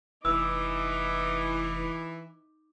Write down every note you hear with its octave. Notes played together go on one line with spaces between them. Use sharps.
F1 E3 D#4 D6 E6